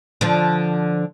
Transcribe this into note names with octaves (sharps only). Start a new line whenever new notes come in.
D3 F3